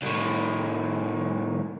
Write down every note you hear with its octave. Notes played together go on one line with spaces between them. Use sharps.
C2 A2